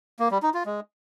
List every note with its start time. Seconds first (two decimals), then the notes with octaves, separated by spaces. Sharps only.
0.20 A#3
0.31 G3
0.43 D#4
0.54 F4
0.66 G#3